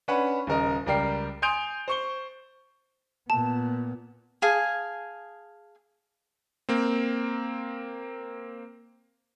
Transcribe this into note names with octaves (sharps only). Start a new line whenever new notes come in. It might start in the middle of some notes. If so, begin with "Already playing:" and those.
C#4 D4 B4 C#5 F#5 B5
D#1 C#3 A#4 D#5
C#2 G3 A#4 D5 G5 C7
G#5 C6 D#6 G6 D7 F7
C5 C#6 G7
A#2 B3 A5
G#4 F5 G#5 A5
A#3 C4